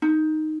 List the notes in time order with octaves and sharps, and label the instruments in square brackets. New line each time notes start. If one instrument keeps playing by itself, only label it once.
[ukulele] D#4